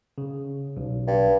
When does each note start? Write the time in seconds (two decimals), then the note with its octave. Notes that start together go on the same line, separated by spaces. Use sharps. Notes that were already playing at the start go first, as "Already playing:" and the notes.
0.18 C#3
0.77 B1
1.07 G2